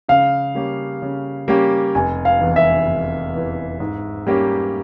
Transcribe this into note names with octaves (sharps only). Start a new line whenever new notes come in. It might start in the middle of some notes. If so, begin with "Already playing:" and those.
C#3 F5
G3 A#3 C#4 G4
C#3
G3 A#3 C#4 G4
F1 G#5
F5
E2 E3
E5
F1
E2 E3
G#2
G3 A#3 C#4 G4